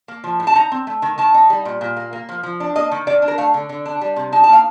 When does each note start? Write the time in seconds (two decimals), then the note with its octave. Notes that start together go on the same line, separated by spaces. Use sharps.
0.08 A#3
0.24 F3
0.40 A2
0.47 A5
0.55 D#4 A#5
0.72 C4
0.87 A3
1.02 D#3
1.18 D#3 A5
1.34 D#4
1.50 G3
1.65 A#2
1.81 A#2
1.97 A#3
2.13 A#3
2.29 F3
2.43 F3
2.60 D4
2.75 A#3 D#5
2.91 D#3
3.07 D#3 D5
3.22 D4
3.28 A#4
3.38 A3 F5
3.54 D3
3.69 D3
3.86 D4
4.01 G3
4.16 C3
4.32 D#4 A5
4.44 A5
4.49 A#3 F5